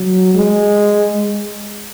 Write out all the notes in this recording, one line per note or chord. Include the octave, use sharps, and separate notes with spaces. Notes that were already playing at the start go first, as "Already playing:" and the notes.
Already playing: F#3
G#3